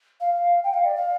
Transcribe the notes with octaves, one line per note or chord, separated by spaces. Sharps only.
F5
G5
F5
D5
F5